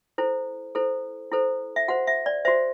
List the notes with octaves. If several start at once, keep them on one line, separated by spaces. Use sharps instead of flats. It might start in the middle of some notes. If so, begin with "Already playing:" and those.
E4 A4 C5
E4 A4 C5
E4 A4 C5
E5
F#4 C5 F#5
E5
D5
F#4 C5 E5